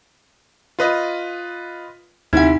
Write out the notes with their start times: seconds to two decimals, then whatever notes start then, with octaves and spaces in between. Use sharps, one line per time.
0.79 F4 B4 D#5
2.33 D#2 C3 D#4 E4 F#5